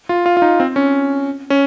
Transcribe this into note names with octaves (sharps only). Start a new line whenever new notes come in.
F4
F4
F4
D#4
C4
C#4
C#4